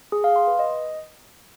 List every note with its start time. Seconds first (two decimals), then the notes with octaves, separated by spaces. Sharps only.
0.12 G#4
0.24 F5
0.36 C6
0.47 B4
0.59 D#5